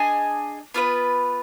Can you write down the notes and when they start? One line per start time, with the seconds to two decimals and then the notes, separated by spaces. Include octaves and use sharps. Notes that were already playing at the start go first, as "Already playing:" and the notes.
Already playing: D4 G#4 D#5 G#5
0.74 B3 F4 B4